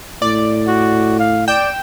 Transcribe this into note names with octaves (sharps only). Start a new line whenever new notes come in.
A2 D5
F#4
F5
D5 G5 E7